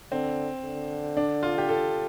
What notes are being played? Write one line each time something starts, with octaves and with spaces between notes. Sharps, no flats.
D3 C4
D3
D4
F4
G4
A4